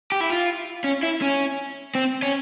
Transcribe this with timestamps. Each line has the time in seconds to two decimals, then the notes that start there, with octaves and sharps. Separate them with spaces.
0.12 G4
0.21 E4
0.30 F4
0.84 C#4
1.03 E4
1.22 C#4
1.95 C4
2.23 C#4